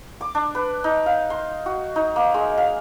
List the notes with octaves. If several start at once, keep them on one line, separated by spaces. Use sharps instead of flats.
D6
D4
B4
D#4
F5
C6
F#4
D#4
A#3
G#3
F5